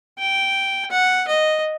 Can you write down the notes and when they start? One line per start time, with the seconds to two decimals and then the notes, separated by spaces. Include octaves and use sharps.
0.19 G5
0.91 F#5
1.28 D#5